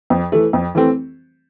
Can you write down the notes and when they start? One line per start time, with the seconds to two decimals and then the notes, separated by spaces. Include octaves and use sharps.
0.10 F2
0.32 E3 A3
0.53 F2
0.75 E3 A3 C4